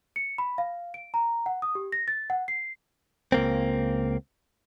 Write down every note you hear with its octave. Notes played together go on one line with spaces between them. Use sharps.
C#7
B5
F5
D7
A#5
F#5
D#6
G4
A#6
A6
F#5
C7
C#2 A#3 C4